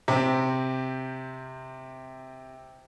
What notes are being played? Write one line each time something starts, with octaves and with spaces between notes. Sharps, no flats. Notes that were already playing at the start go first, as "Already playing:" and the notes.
C3 C4